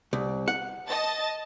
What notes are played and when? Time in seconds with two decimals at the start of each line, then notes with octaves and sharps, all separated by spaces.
0.13 C2
0.48 F#5
0.88 D#5 A5 A6